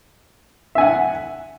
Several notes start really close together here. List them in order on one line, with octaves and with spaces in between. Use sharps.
E5 G#5 F#5